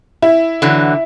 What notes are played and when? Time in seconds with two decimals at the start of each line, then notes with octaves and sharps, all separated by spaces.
0.22 E4
0.62 D3 E3 F#3